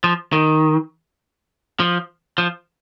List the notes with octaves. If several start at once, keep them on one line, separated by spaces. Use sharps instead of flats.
F3
D#3
F3
F3